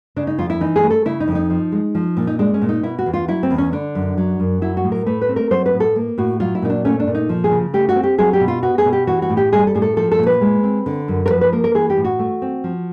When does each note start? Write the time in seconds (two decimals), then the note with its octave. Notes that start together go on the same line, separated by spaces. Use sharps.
0.16 C#3 D4
0.27 D#4
0.38 F2 F4
0.50 E4
0.61 E3 D#4
0.76 G#4
0.83 A3
0.91 A4
1.05 C#3 E4
1.20 D#4
1.28 F2
1.35 D#4
1.50 F3
1.72 G#3
1.95 F3
2.17 A#2
2.27 D#4
2.39 G#3 D4
2.54 C#4
2.62 A#2
2.69 D#4
2.83 B2 E4
2.99 F#4
3.06 E2
3.14 F4
3.28 F#3 E4
3.43 C4
3.50 E2
3.58 C#4
3.73 D3 D4
3.95 F#2
4.17 F#3
4.40 F#2
4.62 F#3 E4
4.77 F#4
4.84 A2
4.92 A#4
5.06 A3 B4
5.22 B4
5.29 C4
5.36 A#4
5.51 F#3 C5
5.66 B4
5.73 A2
5.80 A4
5.96 A#3
6.18 A2 F#4
6.40 F#3 F4
6.55 E4
6.62 A#2 D#4
6.70 D4
6.85 A3 C#4
7.00 D4
7.07 A#2
7.15 D#4
7.29 F3
7.44 G#4
7.51 C#3
7.74 A3 G4
7.89 F#4
7.96 C4
8.03 G4
8.18 F#3 G#4
8.33 G4
8.41 B2
8.48 F4
8.63 B3 F#4
8.78 G#4
8.85 B2
8.93 G4
9.07 E3 F#4
9.22 F#4
9.30 A2
9.37 G4
9.52 G3 G#4
9.67 A4
9.75 A2 G#4
9.82 A4
9.97 F3 A4
10.12 A4
10.19 A#2
10.27 B4
10.41 G#3
10.63 C4
10.86 D3
11.08 F#2
11.26 A#4
11.30 F3 B4
11.41 B4
11.53 A#3 A#4
11.64 A#4
11.75 E3 G#4
11.90 G4
11.97 A2
12.05 F#4
12.19 A3
12.42 C4
12.64 F3